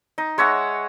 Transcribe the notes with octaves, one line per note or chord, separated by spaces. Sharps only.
D#4
G#3 C#5 E5 F#5